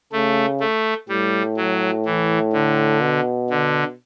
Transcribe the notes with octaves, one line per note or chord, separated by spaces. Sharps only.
C#3 A3
A3
A2 G3
F#3
E3
D3
B2
D3